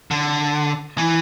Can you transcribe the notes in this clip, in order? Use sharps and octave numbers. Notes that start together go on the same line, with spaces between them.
D3
E3